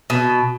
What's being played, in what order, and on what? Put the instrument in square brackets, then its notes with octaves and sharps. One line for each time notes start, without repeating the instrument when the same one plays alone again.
[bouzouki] B2